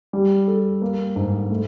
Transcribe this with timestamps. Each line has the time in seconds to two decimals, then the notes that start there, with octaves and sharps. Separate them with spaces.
0.13 G3
0.48 A4
0.82 A#3
1.16 G#2
1.50 A3